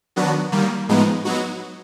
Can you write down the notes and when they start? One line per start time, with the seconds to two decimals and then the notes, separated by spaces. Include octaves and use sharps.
0.16 D#3 F#3 B3 D4 F#4
0.52 D#3 G3 A#3
0.89 A2 F3 G#3 B3 D#4
1.25 F#3 B3 D#4 F#4